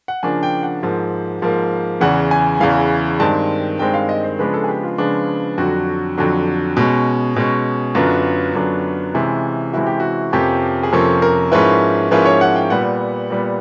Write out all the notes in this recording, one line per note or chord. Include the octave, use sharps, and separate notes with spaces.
F#5
C#3 F3 A#3 D4 G#5
G5
F#5
G#2 F3 A#3
G#2 F3 A#3
E2 C#3 E3 F#5
G#5
E2 C#3 E3 F5
G2 D#3 G#3 C4 A5
G2 D#3 G#3 C4 G5
F5
D#5
C5
C#3 F3 G#3 B3 D4 B4
A4
G#4
G4
F4
C#3 F3 G#3 B3 D4
F2 D3 F#3 F#4
F2 D3 F#3
B2 G#3 C#4
B2 G#3 C#4
F#2 D3 F#3 B3 D4 F4
F#2 D3 F#3 B3 D4
C3 E3 G#3 C#4 E4
C3 E3 G#3 C#4 E4 F#4
G4
F#4
F2 C3 F3 A#3 C#4 G4
G#4
F2 C3 F3 A#3 C#4 A4
A#4
G#2 F3 A#3 C#4 E4 B4
G#2 F3 A#3 C#4 E4 B4
C#5
F#5
G5
A#2 G3 B3 F#5
A#2 G3 B3